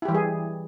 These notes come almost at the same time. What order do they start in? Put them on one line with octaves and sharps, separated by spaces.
E4 G4 E3 G3 G#4